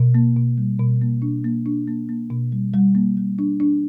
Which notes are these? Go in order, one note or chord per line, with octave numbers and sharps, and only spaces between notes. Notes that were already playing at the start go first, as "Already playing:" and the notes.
Already playing: B2
A#3
B2
G3
B2
A#3
D4
A#3
D4
A#3
A#3
B2
G3
G3
A#3
G3
D4
D4